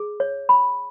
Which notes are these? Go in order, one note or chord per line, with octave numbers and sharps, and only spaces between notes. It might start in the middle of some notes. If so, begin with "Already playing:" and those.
Already playing: G#4
C#5
B5